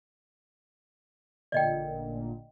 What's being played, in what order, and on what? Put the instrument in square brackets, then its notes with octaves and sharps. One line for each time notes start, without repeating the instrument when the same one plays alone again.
[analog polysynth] A1 A#2 D3 [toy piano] D5 D#5 G5